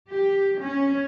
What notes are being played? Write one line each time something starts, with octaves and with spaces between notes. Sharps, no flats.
G4
C#4